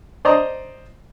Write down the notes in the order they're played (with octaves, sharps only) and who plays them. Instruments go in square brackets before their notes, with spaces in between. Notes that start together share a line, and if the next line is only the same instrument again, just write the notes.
[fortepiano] C5 D5 D#5 A#5